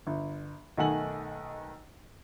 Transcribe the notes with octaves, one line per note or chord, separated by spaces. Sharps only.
G1
B1 D#3 A3 F#5 G#5 F#7